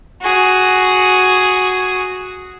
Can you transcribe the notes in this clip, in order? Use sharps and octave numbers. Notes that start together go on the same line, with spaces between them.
F#4 G#4